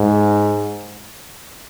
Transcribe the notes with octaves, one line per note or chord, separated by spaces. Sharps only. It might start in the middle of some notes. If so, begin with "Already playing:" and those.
Already playing: G#2